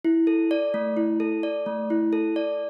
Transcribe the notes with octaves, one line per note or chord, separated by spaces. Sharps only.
E4
A4
D5
A3
E4
A4
D5
A3
E4
A4
D5